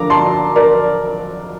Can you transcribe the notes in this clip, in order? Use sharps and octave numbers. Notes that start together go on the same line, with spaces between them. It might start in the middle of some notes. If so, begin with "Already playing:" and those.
Already playing: D3 F3 A#3 A#5 D6
A5 C6
A#4 D5